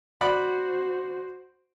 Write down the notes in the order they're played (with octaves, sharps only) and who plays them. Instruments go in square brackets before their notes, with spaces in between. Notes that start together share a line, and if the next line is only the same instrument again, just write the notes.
[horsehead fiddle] F#4 C5 [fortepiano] D5 F#5 B5